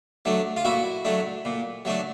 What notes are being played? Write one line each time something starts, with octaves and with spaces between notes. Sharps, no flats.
F#3 A3 D4
F4
A#2 E4 F#4
F#3 A3 D4
A#2
F#3 A3 D4